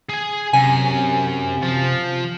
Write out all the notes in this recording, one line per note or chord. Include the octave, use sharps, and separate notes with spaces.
G#4 G#5
F#2 C3 G#5
F3